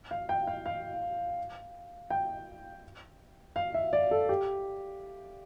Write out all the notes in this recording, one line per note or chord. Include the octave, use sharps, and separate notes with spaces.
F5
G5
F5
F5
G5
F5
E5
D5
A4
G4